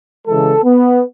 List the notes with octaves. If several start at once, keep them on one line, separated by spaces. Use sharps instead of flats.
C#3 E3 G#3 A4
B3